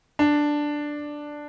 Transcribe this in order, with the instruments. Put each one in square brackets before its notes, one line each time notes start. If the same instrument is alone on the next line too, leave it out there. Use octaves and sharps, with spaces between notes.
[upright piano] D4